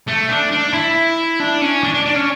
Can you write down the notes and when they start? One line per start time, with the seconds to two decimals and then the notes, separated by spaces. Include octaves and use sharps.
0.08 A3
0.30 D4
0.52 D4
0.73 E4
1.40 D4
1.61 C#4
1.84 D4
1.94 D4
2.06 D4
2.16 C#4